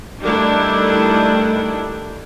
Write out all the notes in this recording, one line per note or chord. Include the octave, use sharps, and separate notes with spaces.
D#3 G3 A3 D4 E4